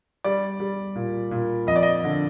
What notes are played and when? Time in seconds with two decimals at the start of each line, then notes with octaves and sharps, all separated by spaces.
0.24 G3 D5
0.60 G3
0.95 A#2
1.31 A#2
1.67 F2 D#5
1.76 D5
1.83 D#5
2.04 D3